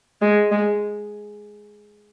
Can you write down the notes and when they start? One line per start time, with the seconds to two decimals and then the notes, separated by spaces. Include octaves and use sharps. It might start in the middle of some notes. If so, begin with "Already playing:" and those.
0.22 G#3
0.51 G#3